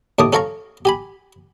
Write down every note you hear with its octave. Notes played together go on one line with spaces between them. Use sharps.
D#2 A2 A5 D6 D#6
C#4 A4 C#5 F5 A#5 C#6
G4 G#5 B5